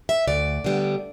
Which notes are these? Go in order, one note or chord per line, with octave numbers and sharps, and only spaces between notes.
E5
D2 D5
D3 G3 B3